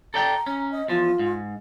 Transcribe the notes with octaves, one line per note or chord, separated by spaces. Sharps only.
A4 D5 G5 A#5
C#4 A#5
D#5
E2 F3 F4
G#2